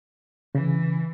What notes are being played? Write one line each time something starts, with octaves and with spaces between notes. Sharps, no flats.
C#3 E3